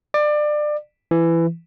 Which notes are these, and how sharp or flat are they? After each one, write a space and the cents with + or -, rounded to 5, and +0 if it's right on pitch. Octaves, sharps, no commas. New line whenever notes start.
D5 +25
E3 +15